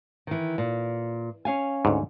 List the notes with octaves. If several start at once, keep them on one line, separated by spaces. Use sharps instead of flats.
D#3 E3
A#2
C#4 F5 G#5
D2 G#2